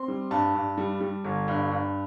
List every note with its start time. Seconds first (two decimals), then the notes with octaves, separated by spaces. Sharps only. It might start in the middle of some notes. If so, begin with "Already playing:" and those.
Already playing: C4 C6
0.08 G3
0.31 G2 A5
0.55 G2
0.77 G3
1.01 G3
1.24 G1
1.48 G2
1.71 G2